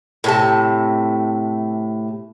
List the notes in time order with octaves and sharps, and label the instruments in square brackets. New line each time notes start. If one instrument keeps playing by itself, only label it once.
[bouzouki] A2 C3 A5